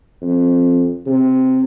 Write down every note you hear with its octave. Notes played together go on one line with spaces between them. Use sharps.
F2
C3